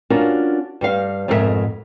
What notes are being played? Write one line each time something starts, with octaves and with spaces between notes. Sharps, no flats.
C#4 D4 F4 F#4 A#4
G2 G3 F5
F2 G#2 B2 G4 A#4 E5